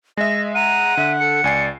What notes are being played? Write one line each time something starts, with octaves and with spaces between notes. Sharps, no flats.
G#3 D#5 E5 A#6
F#5 A#5 D#7
D3 E5
A4 C#7
C#2 D5 G#5 C7